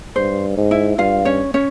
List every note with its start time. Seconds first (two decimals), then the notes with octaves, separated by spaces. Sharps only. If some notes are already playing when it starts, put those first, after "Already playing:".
0.16 G2 C5
0.58 G#2
0.71 E4 E5
0.98 G2 F4 F5
1.25 C#4 C#5
1.54 C#4 C#5